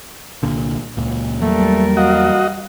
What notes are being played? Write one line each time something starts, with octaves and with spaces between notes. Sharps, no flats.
C2 A#2 D3
C#2 A#2
E2 F#3 G3 A3 A#3 A#4
F#4 D#5 F5